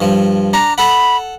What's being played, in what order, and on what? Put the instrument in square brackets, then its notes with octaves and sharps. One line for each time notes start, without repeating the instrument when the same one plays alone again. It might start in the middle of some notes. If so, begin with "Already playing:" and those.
[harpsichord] G2 F3
[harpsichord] D4 [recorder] A#5
[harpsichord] A4 F#5 [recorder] B5